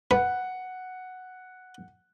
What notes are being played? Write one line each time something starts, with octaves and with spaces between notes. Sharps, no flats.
B4 F#5